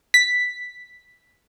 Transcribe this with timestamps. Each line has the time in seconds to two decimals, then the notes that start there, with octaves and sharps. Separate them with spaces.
0.14 B6